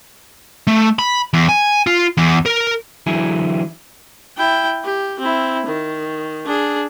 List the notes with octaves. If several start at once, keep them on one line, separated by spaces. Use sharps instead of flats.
A3
B5
E2
G#5
F4
E2
A#4
D3 E3 F#3 E4 G#4
E4 G5
G4
C4 E4
D#3
D4 G#4